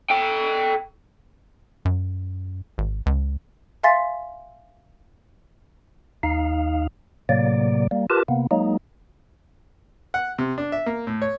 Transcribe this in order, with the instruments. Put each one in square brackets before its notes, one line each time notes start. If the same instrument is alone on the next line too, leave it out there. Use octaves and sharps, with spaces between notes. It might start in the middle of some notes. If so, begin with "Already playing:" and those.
[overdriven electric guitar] A4 G5
[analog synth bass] F#2
G#1
C#2
[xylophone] E5 F5 G#5 C6 A6 B6
[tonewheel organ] D#2 D#4 F5
A2 C3 F#3 A#3 D5
G3 A#3
F4 G4 A#4 B4 A5
C3 A#3 B3
F#3 G#3 A#3 D#4
[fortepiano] F#5
C3
D4
E5
A#3
A2
C#5